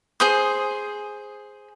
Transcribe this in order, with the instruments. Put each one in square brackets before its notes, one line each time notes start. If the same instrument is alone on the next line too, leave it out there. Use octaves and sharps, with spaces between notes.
[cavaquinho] G#4 C5 D#6